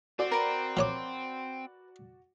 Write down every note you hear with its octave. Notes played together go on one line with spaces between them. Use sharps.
C4 F#4 D5
A#4 B4
F3 C#5 D6